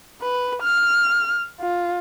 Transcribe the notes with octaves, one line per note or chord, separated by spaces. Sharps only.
B4
F6
F4